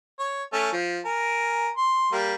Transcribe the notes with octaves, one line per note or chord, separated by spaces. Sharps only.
C#5
A3 C#4 A4
F3
A#4 G#5
C6
G3 A#3